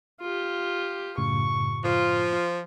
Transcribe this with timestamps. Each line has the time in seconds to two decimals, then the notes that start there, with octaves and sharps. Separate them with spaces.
0.21 F4 G4
1.18 F#2 A2 C#3 C#6
1.84 F3 F4